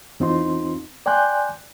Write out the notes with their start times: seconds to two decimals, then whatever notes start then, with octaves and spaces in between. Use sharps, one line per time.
0.20 E2 C4 D#4 F4 C6
1.06 D5 G5 G#5 C6 F#6 G6